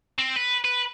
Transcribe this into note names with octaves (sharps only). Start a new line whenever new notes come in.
C4
B4
B4